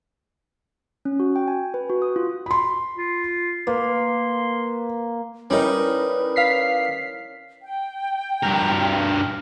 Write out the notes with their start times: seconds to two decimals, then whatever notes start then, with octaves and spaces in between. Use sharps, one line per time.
1.05 C#4
1.20 F#4
1.36 G5
1.48 G#5
1.74 B4
1.89 F#4
2.02 D#6
2.16 F4
2.46 B5 C6
2.96 F4
3.67 A#3 B4 C6
5.50 G3 C#4 D#4 E4 A#4 B4
6.36 F5 B6 C7
7.63 G5
8.43 G2 A#4